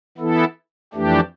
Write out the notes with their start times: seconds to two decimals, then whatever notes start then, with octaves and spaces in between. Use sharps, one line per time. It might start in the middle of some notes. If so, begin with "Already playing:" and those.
0.18 E3 B3 E4 A4
0.94 F2 E3 A3 D4 G4